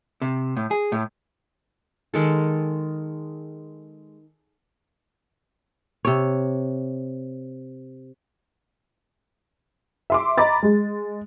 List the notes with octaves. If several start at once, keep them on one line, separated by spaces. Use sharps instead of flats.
C3
A2
G#4
A2
D#3 G#3 A4
C3 C#5
E5 C6 D6
D#5 A#5 B5 D6 A6
G#3